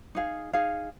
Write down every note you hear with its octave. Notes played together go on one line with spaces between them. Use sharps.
D#4 G#4 F5
D#4 G#4 F5